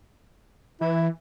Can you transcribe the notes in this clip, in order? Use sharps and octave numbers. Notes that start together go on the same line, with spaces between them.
E3 E4